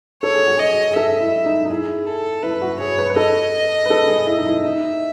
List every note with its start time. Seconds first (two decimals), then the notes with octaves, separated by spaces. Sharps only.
0.23 A4 C#5
0.35 G#4
0.46 F#4
0.57 G#4 D#5
0.91 G#4
0.96 A4 E5
1.20 E4
1.46 D#4
1.65 D#4
1.70 E4 G#4
2.07 A4
2.43 E4 B4
2.62 F#4
2.80 G#4 C#5
2.98 B4
3.10 B4
3.16 A4 D#5
3.86 B4
3.90 A4
4.08 G#4
4.27 E4
4.38 D#4
4.46 E4
4.64 D#4 E5